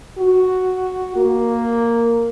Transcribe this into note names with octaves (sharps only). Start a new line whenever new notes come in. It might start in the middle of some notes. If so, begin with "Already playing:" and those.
F#4
A#3